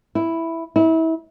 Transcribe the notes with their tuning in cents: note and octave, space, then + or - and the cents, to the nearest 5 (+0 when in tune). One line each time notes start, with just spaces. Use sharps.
E4 +0
E4 -30